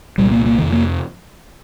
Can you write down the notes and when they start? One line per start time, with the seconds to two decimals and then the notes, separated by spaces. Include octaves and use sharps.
0.18 C2 A#2 G3
0.31 A#3
0.46 A#3
0.59 F2 C3 D#3
0.73 A#3